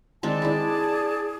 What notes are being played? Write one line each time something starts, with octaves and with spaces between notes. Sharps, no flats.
D#3 G#3 C4 D5 A5
D4 E4 G#4